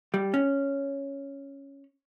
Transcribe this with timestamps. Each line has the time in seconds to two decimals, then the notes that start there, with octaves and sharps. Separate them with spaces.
0.14 G3
0.34 C#4